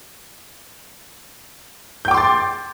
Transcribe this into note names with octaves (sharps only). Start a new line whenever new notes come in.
G5 C6 D6 G6 A6